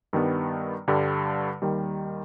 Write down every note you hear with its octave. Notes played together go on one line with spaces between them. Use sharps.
G2 D#3 G3 B3
G2 D3 G3
D#2 D#3 G3